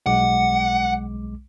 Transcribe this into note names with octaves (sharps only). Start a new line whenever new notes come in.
B1 G#3 F#5 D6